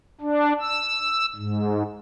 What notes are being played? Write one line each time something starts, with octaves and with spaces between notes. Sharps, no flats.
D4
E6
G#2